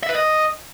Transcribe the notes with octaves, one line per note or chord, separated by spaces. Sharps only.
E5
B4
D#5